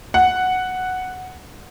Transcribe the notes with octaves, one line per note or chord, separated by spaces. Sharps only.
F#5